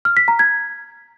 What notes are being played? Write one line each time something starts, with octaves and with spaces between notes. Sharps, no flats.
F6
B6
A#5
G#6